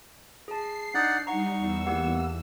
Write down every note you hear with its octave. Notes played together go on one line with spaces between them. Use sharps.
G#4 A5 C7
D4 D#4 D5 F#5
G3 D#4 F#5 A#5 C#6
E2 E6
A#3 G4 F#5